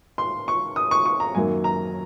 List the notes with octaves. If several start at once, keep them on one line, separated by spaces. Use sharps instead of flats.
C6
C#6
D#6
C#6
C#6
A#5
F#2 D#3 F#3 A#3 G#5
A#5